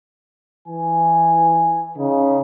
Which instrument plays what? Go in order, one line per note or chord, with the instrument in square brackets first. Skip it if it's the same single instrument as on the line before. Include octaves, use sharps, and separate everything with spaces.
[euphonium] E3 [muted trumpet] G#5
[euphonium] C#3 [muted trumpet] D#4